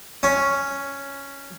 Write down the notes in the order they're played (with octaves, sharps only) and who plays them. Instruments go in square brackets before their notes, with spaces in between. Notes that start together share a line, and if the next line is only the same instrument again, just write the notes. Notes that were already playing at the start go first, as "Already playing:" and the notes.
[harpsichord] C#4